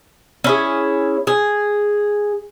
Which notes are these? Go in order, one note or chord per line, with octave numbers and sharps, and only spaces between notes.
C#4 E4 G#4
G#4